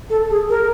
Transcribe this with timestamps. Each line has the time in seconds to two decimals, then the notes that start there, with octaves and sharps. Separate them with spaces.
0.10 A4
0.30 G#4
0.49 A#4